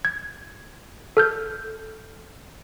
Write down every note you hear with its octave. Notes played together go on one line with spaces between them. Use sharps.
G#6
A4 F6 G6